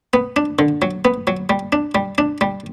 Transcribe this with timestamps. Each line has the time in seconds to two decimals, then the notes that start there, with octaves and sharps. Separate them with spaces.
0.14 B3
0.36 D4
0.59 D3
0.82 F#3
1.05 B3
1.27 F#3
1.50 G3
1.73 D4
1.95 G3
2.18 D4
2.41 G3